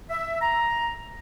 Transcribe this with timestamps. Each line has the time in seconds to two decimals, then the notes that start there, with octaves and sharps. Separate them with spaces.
0.10 E5
0.41 A#5